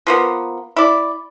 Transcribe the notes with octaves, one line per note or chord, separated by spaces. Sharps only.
F3 A#3 B3
E4 D5